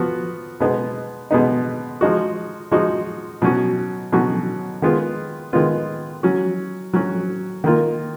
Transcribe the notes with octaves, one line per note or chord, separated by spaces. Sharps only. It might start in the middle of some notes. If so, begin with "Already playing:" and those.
Already playing: F3 B3 F#4
B2 G#3 B3 D#4
B2 G#3 B3 D#4
F3 G#3 D#4 F#4
F3 G#3 D#4 F#4
B2 F#3 C#4 F#4
B2 F#3 C#4 F#4
D#3 G#3 B3 F4
D#3 G#3 B3 F4
F#3 C#4 F#4
F#3 C#4 F#4
D#3 A#3 F4